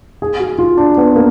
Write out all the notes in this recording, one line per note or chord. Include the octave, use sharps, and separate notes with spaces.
G#4
F#4
F4
D4
B3
A#3